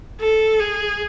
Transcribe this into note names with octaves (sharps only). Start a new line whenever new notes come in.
A4
G#4